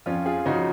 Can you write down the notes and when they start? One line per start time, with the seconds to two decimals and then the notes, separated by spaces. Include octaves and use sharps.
0.06 F2 C#4 F4
0.26 F4 G#4
0.46 C#3 F3 D#4 F#4